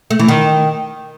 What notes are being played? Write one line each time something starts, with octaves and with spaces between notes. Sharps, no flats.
A3
E3
D#3